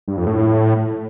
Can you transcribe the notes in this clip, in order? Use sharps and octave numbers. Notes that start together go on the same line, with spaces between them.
G2
F2
A2